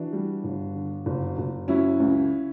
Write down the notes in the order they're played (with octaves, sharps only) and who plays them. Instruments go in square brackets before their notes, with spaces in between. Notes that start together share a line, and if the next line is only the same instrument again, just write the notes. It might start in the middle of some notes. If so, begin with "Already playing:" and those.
Already playing: [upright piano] E3 D4 F#4
G3
G1
D3
F#1
F#1
F#3 C#4 E4
C#2